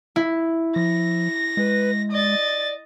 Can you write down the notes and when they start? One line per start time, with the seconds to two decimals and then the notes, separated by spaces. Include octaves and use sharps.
0.16 E4
0.76 F3 A#6
1.57 G#3 B4
2.12 D5 D#5 A6